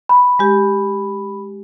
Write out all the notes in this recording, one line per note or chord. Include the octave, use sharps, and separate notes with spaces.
B5
G#3 G4